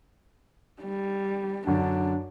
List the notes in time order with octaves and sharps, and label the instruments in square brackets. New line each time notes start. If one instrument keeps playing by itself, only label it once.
[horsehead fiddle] G3
[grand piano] F#2 D3 [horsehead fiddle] D4